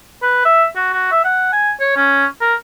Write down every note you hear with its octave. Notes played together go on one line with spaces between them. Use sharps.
B4
E5
F#4
F#4
E5
F#5
G#5
C#5
C#4
A#4